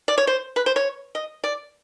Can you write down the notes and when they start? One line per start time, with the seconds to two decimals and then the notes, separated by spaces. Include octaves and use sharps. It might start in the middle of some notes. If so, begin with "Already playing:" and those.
0.08 D5
0.18 C#5
0.27 C5
0.56 B4
0.66 C5
0.76 C#5
1.15 D#5
1.44 D5